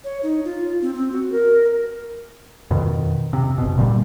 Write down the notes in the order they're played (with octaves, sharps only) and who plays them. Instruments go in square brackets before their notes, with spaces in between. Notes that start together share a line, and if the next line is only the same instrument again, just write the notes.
[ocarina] C#5
D#4
F4
C4
C4
F#4
A#4
[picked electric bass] F2 B2 D#3
C3
F#1 B2
A#2 D3 F#3 G3